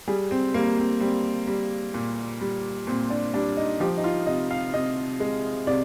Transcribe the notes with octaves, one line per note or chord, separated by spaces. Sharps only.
G3 G#4
C4
G3 A#3
C4
G3 C4
G3
A#2
G3
A#2 C4
D4
G3 D4
D#4
F3 G4
D#4
F4
C3 D#5
F5
C3 D#5
G#3
C3 D5